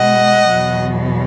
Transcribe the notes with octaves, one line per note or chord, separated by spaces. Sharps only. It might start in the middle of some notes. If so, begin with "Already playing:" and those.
Already playing: B2 G#3 D#5 F#5
E2 B2 F#3